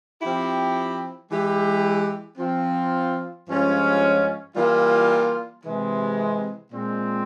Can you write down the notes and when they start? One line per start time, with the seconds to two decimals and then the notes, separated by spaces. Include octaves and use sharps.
0.21 F3 C4 E4 G4
1.30 E3 G#3 E4 G4
2.38 F3 C4 F4
3.47 G2 F3 G#3 C#4 F4
4.56 E3 G3 A#3 F4
5.63 C3 E3 G#3
6.72 A#2 G#3 C4